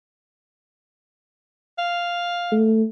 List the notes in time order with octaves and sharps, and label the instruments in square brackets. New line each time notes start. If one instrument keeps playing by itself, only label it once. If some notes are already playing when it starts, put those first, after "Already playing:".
[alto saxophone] F5
[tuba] A3